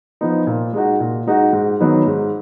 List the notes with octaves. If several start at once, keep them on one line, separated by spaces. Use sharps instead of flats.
F3 B3 D#4
A#2
G#3 D#4 F#4
A#2
G#3 D#4 F#4
G#2
D#3 F#3 B3 D#4
G#2